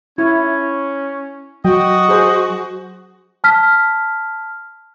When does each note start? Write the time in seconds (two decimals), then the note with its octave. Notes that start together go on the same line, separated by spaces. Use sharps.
0.18 C#4 E4
1.65 F#3 F#4 D#5 G5
2.09 G#4 C5
3.44 A5 F6 B6